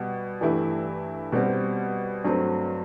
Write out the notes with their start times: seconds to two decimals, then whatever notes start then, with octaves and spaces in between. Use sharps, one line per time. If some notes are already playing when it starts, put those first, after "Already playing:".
Already playing: B2 G3 G4
0.41 G2 E3 A3 E4 G4
1.32 B2 G3 C4 G4
2.24 G2 F#3 A3 C4